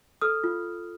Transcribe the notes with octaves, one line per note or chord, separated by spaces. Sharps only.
A4 D#6 F6
F4